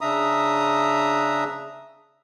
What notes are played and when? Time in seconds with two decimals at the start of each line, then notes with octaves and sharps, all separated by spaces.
0.01 C#3 D4 E5 A#5 D#6